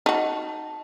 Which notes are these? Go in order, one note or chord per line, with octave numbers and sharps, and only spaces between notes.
D#4 F#4 D#5 A5